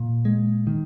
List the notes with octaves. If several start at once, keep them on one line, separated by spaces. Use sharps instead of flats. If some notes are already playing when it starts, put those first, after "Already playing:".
Already playing: A#2
G#3
D#3